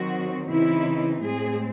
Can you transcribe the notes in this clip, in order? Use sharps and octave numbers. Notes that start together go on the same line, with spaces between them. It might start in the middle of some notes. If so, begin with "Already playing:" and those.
Already playing: D#3 F#3 C4 F#4
C#3 E3 C4 D#4 E4
A2 G#3 C4 G#4